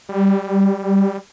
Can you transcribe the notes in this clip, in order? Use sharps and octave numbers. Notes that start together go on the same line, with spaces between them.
G3